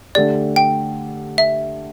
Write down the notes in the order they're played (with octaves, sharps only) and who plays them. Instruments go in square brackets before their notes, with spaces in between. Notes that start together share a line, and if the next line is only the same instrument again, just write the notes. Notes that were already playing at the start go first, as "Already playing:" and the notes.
[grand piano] D3 A3 G4 [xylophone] D5
[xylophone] G5
E5